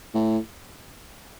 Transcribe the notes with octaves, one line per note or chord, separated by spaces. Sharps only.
A2